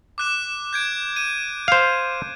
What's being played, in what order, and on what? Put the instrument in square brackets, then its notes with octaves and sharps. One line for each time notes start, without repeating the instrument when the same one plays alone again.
[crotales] D6 F#6 E7
G6 G#6 D7
D#7
[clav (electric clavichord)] C5 F5